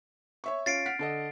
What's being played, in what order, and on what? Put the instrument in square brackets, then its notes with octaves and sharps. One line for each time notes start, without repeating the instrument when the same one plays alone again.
[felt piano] C#5 E5 C#6
[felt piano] C#4 F4 [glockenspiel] A6 C7 D7
[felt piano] F#5 F6 B6
D3 A4 D#5